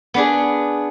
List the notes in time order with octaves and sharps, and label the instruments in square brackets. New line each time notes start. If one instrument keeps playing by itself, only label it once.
[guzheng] B3 D4 G#4